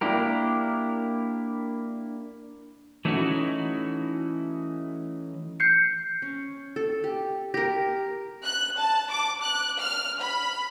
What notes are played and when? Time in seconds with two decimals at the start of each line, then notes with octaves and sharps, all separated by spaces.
0.01 A#3 D4 E4 G4 A#4
3.05 E3 A3 C#4 D#4 E4 F#4
5.60 G6 C7 C#7
6.22 C#4
6.76 A4
7.04 G4
7.54 G4 A#4 A#6
8.44 F#6
8.77 A5
9.11 D6
9.42 F#6
9.79 F6
10.20 B5